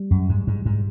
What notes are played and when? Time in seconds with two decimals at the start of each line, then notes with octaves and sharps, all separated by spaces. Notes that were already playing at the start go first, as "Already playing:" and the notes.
Already playing: G3
0.11 F#2
0.29 G#2
0.47 G#2
0.66 G#2